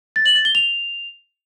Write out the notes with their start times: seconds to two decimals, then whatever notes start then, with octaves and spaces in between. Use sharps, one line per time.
0.16 A6
0.26 F#7
0.35 A6
0.45 G7
0.55 F7